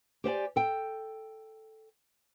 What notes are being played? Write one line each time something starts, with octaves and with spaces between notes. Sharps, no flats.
G4 C5 D5 G#5
A4 G5